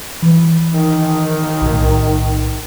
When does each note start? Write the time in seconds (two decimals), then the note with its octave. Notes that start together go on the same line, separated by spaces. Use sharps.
0.23 E3
0.73 D#3
1.62 B1 A2